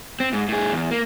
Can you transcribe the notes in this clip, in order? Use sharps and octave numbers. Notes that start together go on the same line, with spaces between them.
C4
G#2
A2 G#4
E2
A#3